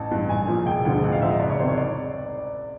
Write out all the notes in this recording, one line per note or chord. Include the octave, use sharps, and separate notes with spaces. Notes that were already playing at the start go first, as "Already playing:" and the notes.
Already playing: A1 A5
G2 E3
A#1 G#5
A#2 F3
E1 G5
D2 D3 F3
A1 F#5
F5
G#2 F3 E5
D#5
F#1 D5
C#5
E2 C3 D#3 C5
C#5
D5